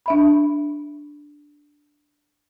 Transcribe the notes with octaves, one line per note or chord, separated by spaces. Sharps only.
D4 E5 B5